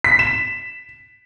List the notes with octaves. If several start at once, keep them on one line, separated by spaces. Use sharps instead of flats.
B6
E7